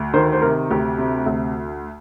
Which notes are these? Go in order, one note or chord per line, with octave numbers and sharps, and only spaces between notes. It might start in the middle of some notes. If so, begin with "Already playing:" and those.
Already playing: D2
D#3 C5
C5
C3 A#4
D2 G4
C3
D2